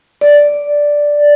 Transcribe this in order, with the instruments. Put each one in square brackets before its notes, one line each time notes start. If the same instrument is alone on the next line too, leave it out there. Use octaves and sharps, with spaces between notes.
[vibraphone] D5